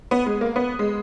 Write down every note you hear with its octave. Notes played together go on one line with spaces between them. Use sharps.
B3
G#3
A#3
B3
G#3